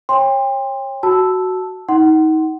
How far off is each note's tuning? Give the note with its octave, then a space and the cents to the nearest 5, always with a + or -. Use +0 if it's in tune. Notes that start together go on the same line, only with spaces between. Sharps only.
C#5 -25 G5 +35 C6 +0
F#4 +5 A5 +0 E6 +0
D#4 +30 F#5 +25 C6 +0